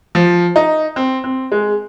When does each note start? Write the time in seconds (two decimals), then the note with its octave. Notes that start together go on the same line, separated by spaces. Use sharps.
0.15 F3
0.56 D#4
0.96 C4
1.24 C4
1.52 G#3